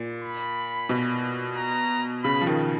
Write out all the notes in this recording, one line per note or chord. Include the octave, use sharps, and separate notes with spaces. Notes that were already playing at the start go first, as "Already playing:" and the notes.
Already playing: A#2
B5
B2
A#5
C#3 B5
F3
D#3